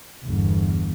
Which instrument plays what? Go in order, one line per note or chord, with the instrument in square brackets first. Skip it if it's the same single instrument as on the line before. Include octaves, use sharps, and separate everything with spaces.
[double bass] G1 E2